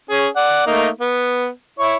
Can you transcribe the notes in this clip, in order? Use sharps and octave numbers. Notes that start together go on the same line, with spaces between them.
C#4 G#4
D5 F#5
A3 A#3 D#4
B3
E4 C#5